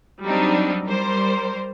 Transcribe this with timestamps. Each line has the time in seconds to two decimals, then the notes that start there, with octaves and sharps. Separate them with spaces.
0.23 F#3 G3 C4 D4 D#4
0.83 G3 A#4 C5